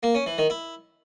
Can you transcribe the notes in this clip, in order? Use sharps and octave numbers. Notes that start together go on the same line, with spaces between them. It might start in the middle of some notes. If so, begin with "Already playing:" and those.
A#3
C#4
E3
D#3
E4